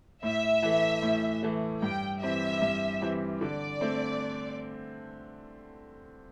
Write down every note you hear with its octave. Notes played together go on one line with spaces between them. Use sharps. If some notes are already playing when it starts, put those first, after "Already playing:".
A2 E5
E3 A3
A2
E3 A3
G2 G5
E3 C4 G4 E5
G2
E3 C4 G4
D3 D5
A3 C4